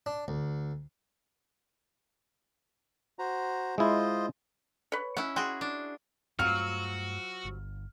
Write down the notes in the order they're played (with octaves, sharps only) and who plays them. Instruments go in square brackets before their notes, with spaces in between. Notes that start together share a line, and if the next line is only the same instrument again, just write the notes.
[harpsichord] D4
D2
[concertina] F#4 C5 A#5
[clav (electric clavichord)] G#3 E4 [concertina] F4 C5 D#5
[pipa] B4 C#5
[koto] C#4 E4 [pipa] F#5
[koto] F#4 G#4 [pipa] G5 C6
[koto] D4
[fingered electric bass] G2 A3 [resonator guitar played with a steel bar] F#3 C4 F4 [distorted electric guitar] F#4 [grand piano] F6
[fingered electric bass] G1